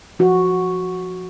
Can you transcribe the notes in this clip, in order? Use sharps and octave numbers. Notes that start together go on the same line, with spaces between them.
F3 F#4